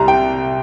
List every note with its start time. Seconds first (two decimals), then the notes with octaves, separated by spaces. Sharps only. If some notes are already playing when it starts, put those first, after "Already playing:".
Already playing: C2 G3 A#5 C6
0.08 G5